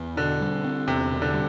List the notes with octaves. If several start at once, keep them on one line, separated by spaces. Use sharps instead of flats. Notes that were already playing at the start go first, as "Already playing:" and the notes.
Already playing: E2
B2 D3
G3
C4
E2 C3
B2
D3
G3